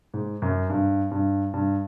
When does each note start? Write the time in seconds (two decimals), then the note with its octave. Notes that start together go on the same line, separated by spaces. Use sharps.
0.14 G#2
0.42 F#2
0.70 G2
1.11 G2
1.54 G2